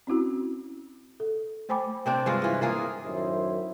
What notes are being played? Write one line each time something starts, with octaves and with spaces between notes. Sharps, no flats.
C4 C#4 E4 F#4
A4
A3 C5 G5 G#5 B5 D6
C3 C4 D4
G2 G#3 F4
E3 F4
A#3 F4 G#4 A#4
F#2 A2 D#3 E4 C5